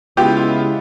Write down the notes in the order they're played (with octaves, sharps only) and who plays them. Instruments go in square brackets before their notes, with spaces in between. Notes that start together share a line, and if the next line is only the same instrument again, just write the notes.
[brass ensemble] C#3 G#3 [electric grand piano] B3 F4 [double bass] E4 [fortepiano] G4